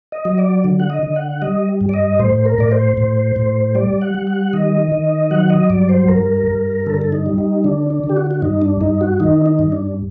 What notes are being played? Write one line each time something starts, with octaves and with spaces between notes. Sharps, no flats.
D#5
F#3
D5
D3
F#5
D#5
D3
F#5
G3 D#5
G2
D5
D#5
A2 C5
A#4
A2 D5
C5
A2
A2
G3 D5
F#5
G3
F#5
D#3 D#5
D#3
F#3 F#5
D#5
G2 D5
C5
G2 A#4
G2
D3 A4
A#4
A4
D#4
G3
D#4
D3 D4
D4
D3
G4
F#4
F#4
G2 D#4
D4
G2 D#4
F#4
D#3 D#4
D#4
G2
D4